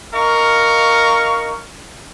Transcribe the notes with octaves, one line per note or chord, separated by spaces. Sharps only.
D#4 A#4 F5 C#6